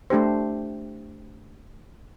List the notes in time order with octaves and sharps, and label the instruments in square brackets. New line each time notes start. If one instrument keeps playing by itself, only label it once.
[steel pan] A3 D4 G4 C5